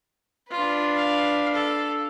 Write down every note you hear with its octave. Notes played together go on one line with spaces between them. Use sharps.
D4 F4 B4
F5
A4